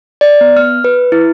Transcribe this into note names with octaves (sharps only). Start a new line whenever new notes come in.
D5
B3
F6
B4
E4